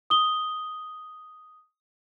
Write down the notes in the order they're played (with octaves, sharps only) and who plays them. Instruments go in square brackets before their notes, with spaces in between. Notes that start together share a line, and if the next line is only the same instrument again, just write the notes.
[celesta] D#6 G7